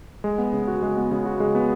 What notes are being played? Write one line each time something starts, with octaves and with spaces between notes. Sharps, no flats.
G#3
B3
C#3
F#4
G#3
B3
C#3
F#4
G#3
B3